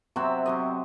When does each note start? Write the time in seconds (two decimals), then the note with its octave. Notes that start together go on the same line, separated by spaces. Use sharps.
0.16 C3 F#3 C4 E5
0.45 C3 F#3 C4 D#5